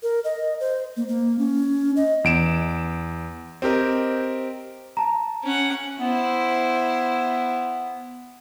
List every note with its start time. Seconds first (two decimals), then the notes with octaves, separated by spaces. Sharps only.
0.03 A#4
0.24 D#5
0.60 C5
0.97 A#3
1.08 A#3
1.39 C#4
1.96 D#5
2.24 E2 D7 E7
3.62 C4 G4 A#4 D#5
4.97 A5 A#5
5.44 C#4 F#5
6.00 B3 E4 C5